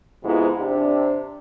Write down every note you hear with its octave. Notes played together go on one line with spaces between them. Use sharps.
F2 G#2 C3 B3 E4 F4
C3 D4 G4